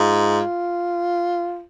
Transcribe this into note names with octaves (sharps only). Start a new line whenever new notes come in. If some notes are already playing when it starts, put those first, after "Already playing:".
Already playing: G#2 F4